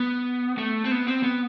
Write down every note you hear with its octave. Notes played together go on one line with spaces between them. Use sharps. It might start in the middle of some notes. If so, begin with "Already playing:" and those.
Already playing: B3
A3
C4
B3
C4
B3